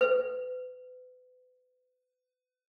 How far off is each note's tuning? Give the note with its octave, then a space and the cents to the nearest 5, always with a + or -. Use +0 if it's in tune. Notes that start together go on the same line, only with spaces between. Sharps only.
B4 +35